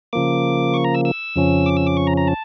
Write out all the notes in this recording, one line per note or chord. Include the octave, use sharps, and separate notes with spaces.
C#3 F3 A#3 D6
C#6
A#5
E6
E6
F2 C#3 F3 C#4
D6
E6
D6
C#6
A#5
A#5
A5